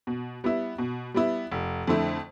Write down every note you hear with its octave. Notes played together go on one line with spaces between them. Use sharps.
B2
G3 B3 E4
B2
G3 B3 E4
F1
F2 D3 A3 E4